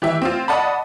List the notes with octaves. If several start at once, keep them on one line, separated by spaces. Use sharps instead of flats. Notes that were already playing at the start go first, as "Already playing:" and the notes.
E3 G4 E5
C4 F4
D5 D#5 F#5 A5 B5